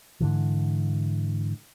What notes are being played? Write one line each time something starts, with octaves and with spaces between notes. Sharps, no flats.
G#2 D3 E3